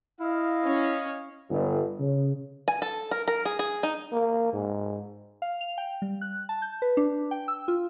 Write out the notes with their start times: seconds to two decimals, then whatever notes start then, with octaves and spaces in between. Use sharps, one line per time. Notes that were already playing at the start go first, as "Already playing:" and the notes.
0.20 E4 D#5 F5
0.65 C#4
1.50 G1
2.00 C#3
2.68 G#5
2.82 A4
3.11 A#4
3.28 A#4
3.45 G#4
3.59 G#4
3.83 D#4
4.12 A#3
4.53 G#2
5.42 F5
5.61 F7
5.78 G5
6.02 G3
6.21 F#6
6.49 A5
6.62 G6
6.82 B4
6.97 D4
7.31 G5
7.48 E6
7.68 F4